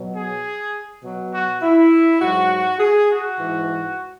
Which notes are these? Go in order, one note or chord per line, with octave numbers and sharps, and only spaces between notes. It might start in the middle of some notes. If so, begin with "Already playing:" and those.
Already playing: B2 F#3
G#4
B2 F#3
F#4
E4
G#2 F#3 F#4
G#4
F#4
G#2 E3